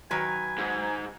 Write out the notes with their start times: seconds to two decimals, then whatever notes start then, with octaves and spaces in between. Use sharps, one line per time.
0.11 D#3 F#3 B4 G#5
0.58 G#2